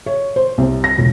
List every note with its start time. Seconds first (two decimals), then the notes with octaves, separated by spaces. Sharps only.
0.06 C#5
0.36 C5
0.58 C2
0.84 A#6
0.98 E1